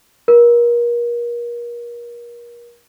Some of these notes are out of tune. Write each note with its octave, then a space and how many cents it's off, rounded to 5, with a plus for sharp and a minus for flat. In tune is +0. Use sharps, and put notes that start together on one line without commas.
A#4 +35